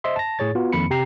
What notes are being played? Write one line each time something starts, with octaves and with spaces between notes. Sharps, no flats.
C5 D#5 E5 C6
A5 A#6
A2 G#4 C#5 A6
B3 F4 F#4
F2 D#3 A#3 B5 C#7
C3 G4 G5 A#5 C7